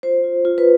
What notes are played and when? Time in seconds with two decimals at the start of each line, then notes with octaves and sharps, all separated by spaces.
0.03 F4 C5
0.24 F4
0.45 F4
0.58 B4